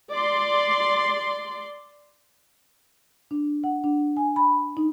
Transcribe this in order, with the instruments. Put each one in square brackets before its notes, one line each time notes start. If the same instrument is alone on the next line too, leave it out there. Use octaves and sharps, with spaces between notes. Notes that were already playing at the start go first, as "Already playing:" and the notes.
[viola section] D5 C6
[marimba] D4
F#5
D4
G#5
B5
D#4